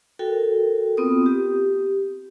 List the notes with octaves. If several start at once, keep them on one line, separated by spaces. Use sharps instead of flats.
F#4 A4 A#4 G5
B3 C4 F4 D#6
G4